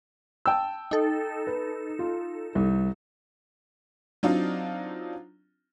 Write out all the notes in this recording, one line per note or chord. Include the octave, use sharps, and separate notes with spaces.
G5 A5 E6
D#4 A4
B4
F4
C2
F#3 C4 D4 D#4 F4